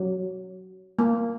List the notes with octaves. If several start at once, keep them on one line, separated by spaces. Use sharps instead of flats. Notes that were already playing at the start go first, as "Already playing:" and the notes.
Already playing: F#3
A#3